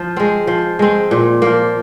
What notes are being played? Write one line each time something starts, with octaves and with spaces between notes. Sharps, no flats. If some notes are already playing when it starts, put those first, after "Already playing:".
Already playing: F3
G#3 C4
F3
G#3 C4
A#2
F3 A#3